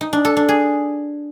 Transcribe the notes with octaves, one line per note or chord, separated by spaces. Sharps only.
D#4
D4
A4
D4
G#4